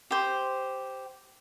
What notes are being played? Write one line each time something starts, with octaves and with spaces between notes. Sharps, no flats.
G4 C5